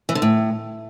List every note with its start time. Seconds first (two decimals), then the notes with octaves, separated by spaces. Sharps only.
0.09 E3
0.15 D3
0.22 A2